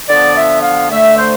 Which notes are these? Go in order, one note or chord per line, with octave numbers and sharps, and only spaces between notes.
D3 F3 B3 D5
E5
F5
D3 A3 E5
C5